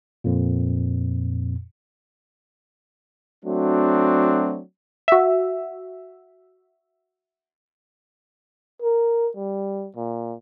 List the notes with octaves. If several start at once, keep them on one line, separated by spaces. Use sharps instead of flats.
F2 A#2
F#3 A3 C4 D4 F#4
F#4 E5
A#4
G3
A#2